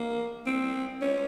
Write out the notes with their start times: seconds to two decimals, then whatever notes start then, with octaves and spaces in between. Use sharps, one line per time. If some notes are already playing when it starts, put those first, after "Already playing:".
Already playing: A#3
0.47 C4
1.02 C#4